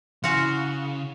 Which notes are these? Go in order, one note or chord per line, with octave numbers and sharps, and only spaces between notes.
C#3 E4 F#4 F5 F#5 G#5 C6